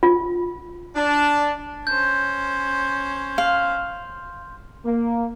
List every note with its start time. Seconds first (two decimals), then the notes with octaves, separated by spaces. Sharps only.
0.03 F4
0.96 D4
1.87 C#4 C5 G6
3.38 F5 C6
4.85 A#3